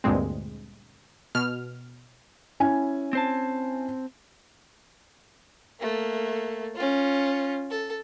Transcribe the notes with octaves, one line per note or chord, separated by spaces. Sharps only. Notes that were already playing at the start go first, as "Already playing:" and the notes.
D2 G2 A#2 G#3 C4
B2 F6
C#4 E4 G#5
C4 C5 A5
A3 A#3
C#4 F4
A4